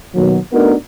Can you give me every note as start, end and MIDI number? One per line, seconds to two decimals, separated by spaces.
0.15 0.38 39
0.15 0.38 47
0.15 0.38 51
0.15 0.38 54
0.53 0.74 57
0.53 0.74 59
0.53 0.74 62
0.53 0.74 63
0.53 0.74 66
0.53 0.74 70